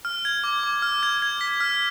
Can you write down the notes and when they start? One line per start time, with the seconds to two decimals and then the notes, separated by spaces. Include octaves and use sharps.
0.05 F6
0.25 G#6
0.44 D6
0.63 D6
0.82 F6
1.03 G#6
1.22 G#6
1.41 B6
1.60 F6